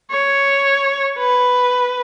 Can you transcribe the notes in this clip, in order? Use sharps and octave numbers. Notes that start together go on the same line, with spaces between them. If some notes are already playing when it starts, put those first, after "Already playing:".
C#5
B4